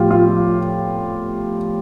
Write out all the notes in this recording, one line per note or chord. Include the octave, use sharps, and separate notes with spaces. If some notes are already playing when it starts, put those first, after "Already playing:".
Already playing: A2 F3 F4 G4
F4